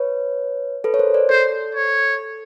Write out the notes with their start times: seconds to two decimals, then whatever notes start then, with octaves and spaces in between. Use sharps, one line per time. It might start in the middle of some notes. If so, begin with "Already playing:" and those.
Already playing: B4 C#5
0.84 A4 B4
0.94 C#5
0.99 A#4 C5
1.14 C5 D5
1.30 A4 C5
1.75 C#5